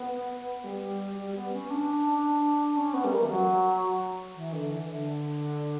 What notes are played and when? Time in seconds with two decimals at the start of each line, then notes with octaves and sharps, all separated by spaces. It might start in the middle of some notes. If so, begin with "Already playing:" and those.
Already playing: B3
0.64 G3
1.17 G3
1.35 B3
1.53 C#4
1.70 D4
2.76 C#4
2.94 B3
3.04 G3
3.12 A#3
3.22 E3
3.29 F#3
4.35 E3
4.53 D3
4.70 E3
4.88 D3